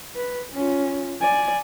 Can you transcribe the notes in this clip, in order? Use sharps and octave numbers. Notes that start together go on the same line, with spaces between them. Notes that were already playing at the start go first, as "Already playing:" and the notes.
B4
C#4 F4
D5 G#5